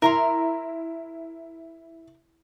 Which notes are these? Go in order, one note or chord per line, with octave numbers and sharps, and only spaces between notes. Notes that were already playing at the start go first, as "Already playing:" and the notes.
E4 A#4 A#5 C6